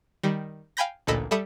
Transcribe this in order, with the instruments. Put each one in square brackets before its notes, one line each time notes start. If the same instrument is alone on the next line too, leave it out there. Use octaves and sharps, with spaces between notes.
[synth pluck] D#3 G3
F5 G5 G#5 B5 G6 A#6
A1 D2 A#2 A4 D#5 B5
G3 A4 E5 B5 D#6 C#7